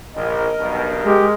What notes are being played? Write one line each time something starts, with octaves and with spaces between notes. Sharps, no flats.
A#1 A#4 D#5
B1 G2 B2
G#3 G4